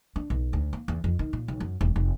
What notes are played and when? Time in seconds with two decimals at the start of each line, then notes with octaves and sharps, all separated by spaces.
0.16 D4
0.30 B1
0.53 D2
0.73 A#3
0.88 E2
1.04 F2
1.19 D#3
1.33 A#2
1.48 B1
1.60 F#2
1.81 E1
1.96 F1